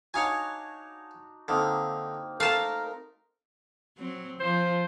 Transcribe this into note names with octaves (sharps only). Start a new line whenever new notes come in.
D4 D#4 F#4 C#5 F5 G#5
D3 A#3 C4 D#4
A3 A#4 F5 A5
F#3 C4
F3 C5